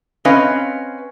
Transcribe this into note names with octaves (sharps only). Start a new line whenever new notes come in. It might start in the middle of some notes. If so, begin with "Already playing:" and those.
C4 C#4 B4 D#5 F5